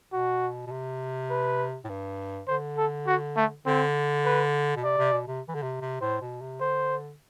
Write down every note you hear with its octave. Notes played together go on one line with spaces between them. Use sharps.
B2 F#4
B2
C3
B4
A2
G2
D3 C5
A4
F#4
A3
D3 C4
B4
B2
C3 D5
C3
B2
C3
E3
D3
C3
C3
A2 C5
B2
C3
D3 C5